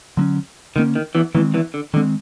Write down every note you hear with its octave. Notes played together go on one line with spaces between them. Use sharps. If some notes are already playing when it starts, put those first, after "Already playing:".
D3 F#3 A#3 C#4
D3 D#3 F#3 A#3 C#4
D#3
E2 E3
E2 D#3 E3 G#3 C4
E2 E3
D3
D3 D#3 G#3 C4